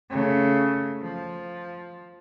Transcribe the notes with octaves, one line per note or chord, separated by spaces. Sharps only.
C#3 A3
F3